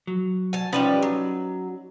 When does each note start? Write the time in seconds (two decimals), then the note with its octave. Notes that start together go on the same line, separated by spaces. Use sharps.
0.07 F#3
0.53 G#5 A5
0.73 F3 G3 C#4 D#4 G4 B4
1.02 F#3